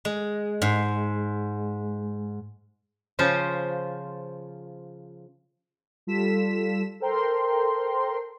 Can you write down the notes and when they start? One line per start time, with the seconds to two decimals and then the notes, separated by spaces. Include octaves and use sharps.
0.05 G#3
0.62 G#2
3.19 C#3 F3 F4 C5
6.07 G3 F4 A4 B6 E7
7.00 A4 A#4 C5 G5 A#5 C6